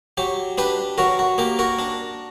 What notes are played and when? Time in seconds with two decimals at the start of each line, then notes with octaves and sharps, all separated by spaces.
0.18 F#3 G4
0.58 D4 G4 B4
0.98 F#3 F#4 A#4
1.19 F#4
1.38 A#3 G4
1.59 F#4 A#4
1.79 D4